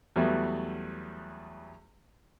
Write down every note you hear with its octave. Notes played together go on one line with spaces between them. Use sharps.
E2 F#3 G3 A3 B3